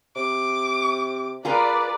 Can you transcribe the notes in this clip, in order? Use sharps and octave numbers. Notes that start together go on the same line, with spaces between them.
C3 D6
F4 G#4 A#4 B4 D5 A#5